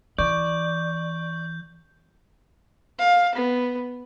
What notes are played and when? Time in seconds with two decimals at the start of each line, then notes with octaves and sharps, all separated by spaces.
0.18 E3 D5 C#6 G6
2.99 F5
3.35 B3